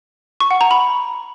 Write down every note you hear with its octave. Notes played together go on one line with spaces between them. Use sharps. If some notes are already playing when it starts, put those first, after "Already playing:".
C#6
F#5
A#5
B5